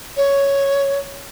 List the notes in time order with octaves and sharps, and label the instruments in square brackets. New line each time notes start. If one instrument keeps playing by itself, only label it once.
[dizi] C#5